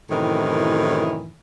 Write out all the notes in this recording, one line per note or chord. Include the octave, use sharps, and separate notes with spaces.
F#2 A2 C3 D#3 E3